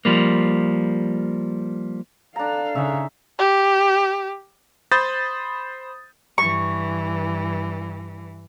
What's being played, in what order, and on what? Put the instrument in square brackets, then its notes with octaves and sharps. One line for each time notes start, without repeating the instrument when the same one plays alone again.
[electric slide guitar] F3 G3 A#3
[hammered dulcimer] D4 A#5 [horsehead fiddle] A4 F5
[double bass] C#3 [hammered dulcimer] D#4 E5
[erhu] G4
[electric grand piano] C5 B5 D#6 G6 A6
[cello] G2 E3 [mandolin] C#6